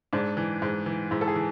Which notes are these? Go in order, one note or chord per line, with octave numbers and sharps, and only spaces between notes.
G#2 D4
E3
G#2
E3
G#2 E4
A4
G#4
E3